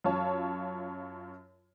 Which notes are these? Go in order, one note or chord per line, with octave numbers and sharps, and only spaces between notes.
F#2 F4 C#5 A5